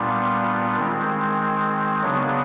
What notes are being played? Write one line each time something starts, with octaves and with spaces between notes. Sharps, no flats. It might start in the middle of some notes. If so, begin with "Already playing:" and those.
Already playing: A#2 G3 B3 D4 F4
D#3 G#3 C4
C#3 F#3 B3 D4